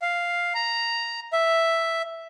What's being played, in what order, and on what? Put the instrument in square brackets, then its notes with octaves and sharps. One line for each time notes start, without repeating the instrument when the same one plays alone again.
[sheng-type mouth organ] F5
A#5
E5